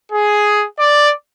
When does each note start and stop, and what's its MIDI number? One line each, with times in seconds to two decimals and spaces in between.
0.12 0.64 68
0.79 1.12 74